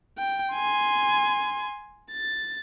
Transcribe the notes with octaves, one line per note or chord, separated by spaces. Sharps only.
G5
G#5 C6
A6